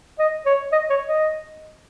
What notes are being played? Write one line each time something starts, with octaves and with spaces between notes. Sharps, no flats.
D#5
C#5
D#5
C#5
D#5